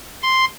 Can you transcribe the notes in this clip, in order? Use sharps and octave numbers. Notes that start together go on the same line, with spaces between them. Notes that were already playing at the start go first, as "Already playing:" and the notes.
C6